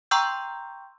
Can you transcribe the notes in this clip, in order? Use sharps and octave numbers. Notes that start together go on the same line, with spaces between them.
G5 A#5 C6 C#6 E6 G6